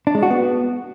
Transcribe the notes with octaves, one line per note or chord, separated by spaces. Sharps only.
D4
G#3
F#4
B3